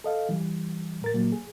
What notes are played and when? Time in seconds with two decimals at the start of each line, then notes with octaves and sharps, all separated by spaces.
0.04 A4 D#5 F5
0.29 E3 G3
1.02 A2 A#4 A6
1.14 A#2 F#3 A#3
1.32 G#4